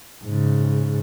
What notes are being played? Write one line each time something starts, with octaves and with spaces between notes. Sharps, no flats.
G#2 C#3